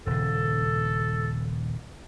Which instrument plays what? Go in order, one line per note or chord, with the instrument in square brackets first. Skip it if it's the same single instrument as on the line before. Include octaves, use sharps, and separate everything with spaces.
[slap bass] D#1 C#3 [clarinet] A4